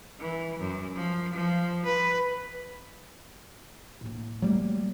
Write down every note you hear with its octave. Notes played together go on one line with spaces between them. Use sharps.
E3
F#2
F3
F3
B4
A2 A#3
F#3 G3 A3 A#3